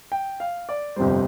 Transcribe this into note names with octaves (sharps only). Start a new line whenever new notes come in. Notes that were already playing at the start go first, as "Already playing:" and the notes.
G5
F5
D5
G1 F2 C3 G3 C5